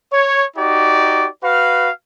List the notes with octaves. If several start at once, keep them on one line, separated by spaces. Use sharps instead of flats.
C#5
D#4 F#4 G4 D5
F#4 B4 F5